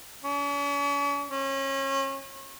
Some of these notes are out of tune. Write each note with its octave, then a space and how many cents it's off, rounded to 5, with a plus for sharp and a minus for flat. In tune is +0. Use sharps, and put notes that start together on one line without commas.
C#4 +45
C#4 -30